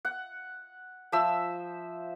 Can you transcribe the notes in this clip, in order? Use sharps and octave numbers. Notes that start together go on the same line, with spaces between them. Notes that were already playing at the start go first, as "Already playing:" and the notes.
F#5
F3 C5 E5 E6